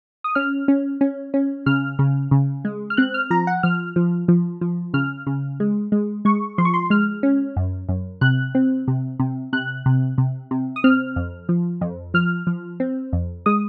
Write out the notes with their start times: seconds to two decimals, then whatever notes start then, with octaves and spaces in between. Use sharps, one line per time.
0.24 D#6
0.35 C#4 F6
0.68 C#4
1.01 C#4
1.34 C#4
1.66 C#3 F6
1.99 C#3
2.31 C#3
2.65 G#3
2.90 F6
2.97 C4 F#6
3.14 F6
3.30 F3 A#5
3.47 F#5
3.63 F3 F6
3.96 F3
4.28 F3
4.61 F3
4.94 C#3 F6
5.27 C#3
5.60 G#3
5.92 G#3
6.25 G#3 C#6
6.58 F3 C6
6.65 C#6
6.74 C6
6.90 G#3 F6
7.23 C#4
7.57 F#2
7.89 F#2
8.21 C3 F#6
8.55 C4
8.88 C3
9.20 C3
9.53 C3 F#6
9.86 C3
10.18 C3
10.51 C3
10.76 D#6
10.84 C4 F6
11.16 F2
11.49 F3
11.81 F2
12.14 F3 F6
12.47 F3
12.80 C4
13.13 F2
13.46 G#3 D#6